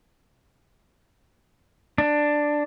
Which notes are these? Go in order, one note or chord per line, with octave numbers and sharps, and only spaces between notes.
D4